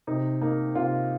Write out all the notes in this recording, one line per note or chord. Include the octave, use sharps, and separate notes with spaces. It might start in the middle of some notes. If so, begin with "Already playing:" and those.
C3 D#4
A#3 D#4
C3 F4